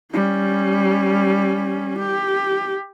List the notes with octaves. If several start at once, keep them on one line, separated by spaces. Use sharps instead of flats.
G3 C#4
G4